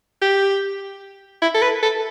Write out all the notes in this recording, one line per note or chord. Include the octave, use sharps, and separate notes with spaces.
G4
E4
A4
B4
A4